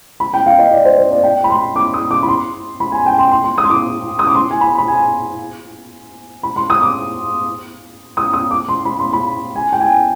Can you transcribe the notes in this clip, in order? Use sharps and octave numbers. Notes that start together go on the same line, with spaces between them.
B5
G5
F5
D#5
D5
C5
C5
D5
G5
B5
C6
D6
D#6
D6
B5
C6
B5
G#5
G5
C6
C6
C6
D#6
C6
D6
D#6
D6
C6
G#5
B5
B5
G#5
B5
C6
D#6
D6
D#6
D#6
D6
C6
B5
C6
B5
G#5
G5
G#5